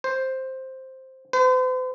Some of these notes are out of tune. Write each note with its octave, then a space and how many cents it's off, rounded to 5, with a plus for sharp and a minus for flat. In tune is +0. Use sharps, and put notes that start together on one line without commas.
C5 +5
C5 -45